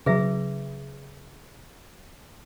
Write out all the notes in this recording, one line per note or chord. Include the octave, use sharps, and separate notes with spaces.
C#3 F#3 G#4 B4 E5